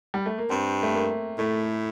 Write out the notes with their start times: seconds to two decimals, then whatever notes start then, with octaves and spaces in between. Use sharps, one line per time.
0.14 G3
0.26 A3
0.38 A#3
0.50 G2 C4
0.83 A3
0.94 A#3
1.38 A2 A3